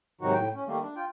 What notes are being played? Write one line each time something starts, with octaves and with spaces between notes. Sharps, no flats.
G#2 C3 D#3 F#3 D#4 F#4
A2 G5
C#4
D#3 G3 A3 A#3
D4
F4 G5